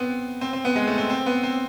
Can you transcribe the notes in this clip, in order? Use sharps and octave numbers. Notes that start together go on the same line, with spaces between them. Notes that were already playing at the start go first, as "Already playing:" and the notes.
Already playing: B3 C4
C4
C4
B3
G#3
A3
C4
C4
B3
C4